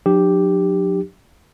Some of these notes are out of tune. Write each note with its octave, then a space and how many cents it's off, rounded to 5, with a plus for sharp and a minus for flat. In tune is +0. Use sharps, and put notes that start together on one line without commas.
F#3 -40 D4 +35 G4 +0